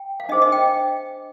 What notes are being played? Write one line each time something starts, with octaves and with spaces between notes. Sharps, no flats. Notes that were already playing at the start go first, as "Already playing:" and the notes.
Already playing: G5
F5
D4 G#4 C5 D#5
D#5
D#5 G5